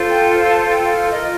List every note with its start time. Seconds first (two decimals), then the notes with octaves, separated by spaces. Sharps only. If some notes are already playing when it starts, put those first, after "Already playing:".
Already playing: F4 A4 C5
0.09 G5
0.30 F5
0.50 A5
0.70 G5
0.91 F5
1.10 F4 A#4 D#5